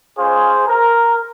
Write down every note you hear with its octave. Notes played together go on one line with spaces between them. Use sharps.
G#3 C#4 F4 G#4 C5
A#4